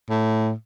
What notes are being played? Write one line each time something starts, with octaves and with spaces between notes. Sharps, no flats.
A2